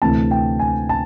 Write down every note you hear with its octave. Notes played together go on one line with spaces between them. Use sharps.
D2 C3 E3 A3 C4 A5
G5
G#5
A5